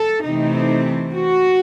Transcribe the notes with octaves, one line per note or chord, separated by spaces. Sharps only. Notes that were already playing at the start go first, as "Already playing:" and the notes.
Already playing: A4
C3 E3 A3 C4 D#4
F#4